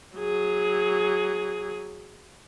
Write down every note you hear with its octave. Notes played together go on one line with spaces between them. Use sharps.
F#3 G#4